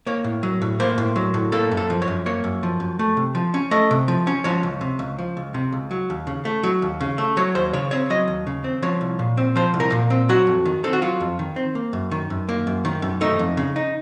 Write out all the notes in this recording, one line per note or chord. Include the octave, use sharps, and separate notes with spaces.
A#3 C#5
A2
F#3
A2
A#3 C5
A2
F#3
A2
A#3 A4
F#2
A4
F3
C#5
F#2
A#3 C#5
F#2
F3
F#2
A3
C3
F3
C#4
A3 D#5
C3
F3
C#4
F3 C#5
C#2
C3
C#2
F3
C#2
C3
C#2
F#3
D#2
C#3
A3
F#3
D#2
C#3
A3
F#3 C#5
D#2 C5
C#3 C#5
C4 C#5
F#3 D#5
D#2
C#3
C4
F3 C#5
C2
A#2
C4
F3 C5
C2
A#4
A#2
C4
F#3 F#4
F2
D#3
C4 A4
F#4
F#3 F4
F2
D#3
C4
A#3
F#2
D#3
F#2
A#3
F#2
D#3
F#2
A3 D#4
F2
C#3
D#4